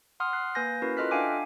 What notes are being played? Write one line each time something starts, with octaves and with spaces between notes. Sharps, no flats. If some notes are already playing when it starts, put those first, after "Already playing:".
F#5 C6 D#6 F6
F#6 C7
A#3 B4 G#5 G6 A#6
C#4 E4 F#4 A#4 B4
F4 A4 D#5 F6 F#6 B6
D4 E5 F5 G5 G#5 D6